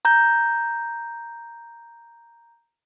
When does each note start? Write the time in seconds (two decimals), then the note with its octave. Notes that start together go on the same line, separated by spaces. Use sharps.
0.05 A#5 G6